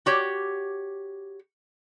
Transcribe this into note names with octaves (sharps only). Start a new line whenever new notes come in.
F#4 G4 C#5